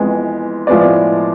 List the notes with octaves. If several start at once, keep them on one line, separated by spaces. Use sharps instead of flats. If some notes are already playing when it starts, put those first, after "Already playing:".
Already playing: F2 E3 G#3 B3
A2 F3 G#3 B3 D5